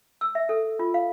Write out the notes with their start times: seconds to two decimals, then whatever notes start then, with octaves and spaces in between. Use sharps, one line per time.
0.21 E6
0.35 E5
0.49 A4
0.79 F4
0.94 F5